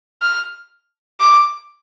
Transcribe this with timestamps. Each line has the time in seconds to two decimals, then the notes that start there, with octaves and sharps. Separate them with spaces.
0.22 F6
1.20 D6